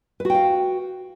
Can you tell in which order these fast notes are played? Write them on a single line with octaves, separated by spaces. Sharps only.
B4 F#4 G5 F5